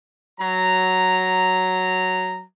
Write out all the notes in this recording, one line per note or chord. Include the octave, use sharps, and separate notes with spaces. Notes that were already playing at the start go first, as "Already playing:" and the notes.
F#3 A#5